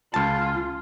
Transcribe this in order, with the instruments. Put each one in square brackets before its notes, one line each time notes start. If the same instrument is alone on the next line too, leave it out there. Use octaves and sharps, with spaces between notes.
[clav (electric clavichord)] C#2 A5 [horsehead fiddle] F4